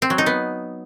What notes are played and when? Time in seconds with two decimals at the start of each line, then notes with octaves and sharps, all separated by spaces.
0.02 C4
0.10 F#3
0.18 D#4
0.26 B3